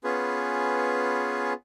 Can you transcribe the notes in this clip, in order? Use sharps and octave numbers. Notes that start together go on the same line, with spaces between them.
B3 C#4 F4 G#4 B4